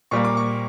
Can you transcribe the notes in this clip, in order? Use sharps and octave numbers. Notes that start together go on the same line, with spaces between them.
A#2 G3 A#3 C#6
D6
C#6